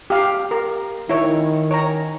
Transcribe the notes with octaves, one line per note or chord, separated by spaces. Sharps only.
G4 F5
A#4
D#3 E4 C#5
C#5 A#5